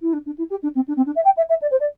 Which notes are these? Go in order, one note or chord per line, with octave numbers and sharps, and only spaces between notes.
E4
D4
D4
E4
G4
D4
C4
D4
C4
D4
E5
G5
E5
E5
D5
C5
D5